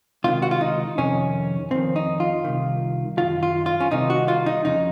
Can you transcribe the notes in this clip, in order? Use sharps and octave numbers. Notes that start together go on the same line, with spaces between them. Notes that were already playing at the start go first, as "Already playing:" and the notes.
C#2 C3 D#3 F4
F#4
F4
D#4
F2 C3 D#3 C#4
F2 D#3 C4
D#4
F4
C2 C3 D#3
F#2 D#3 F4
F4
F4
C#4
C2 C3 D#3 D#4
F#4
F4
D#4
F2 C#3 D#4